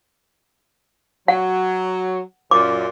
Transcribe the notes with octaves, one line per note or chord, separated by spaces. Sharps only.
F#3 F#5
F#2 A#2 D6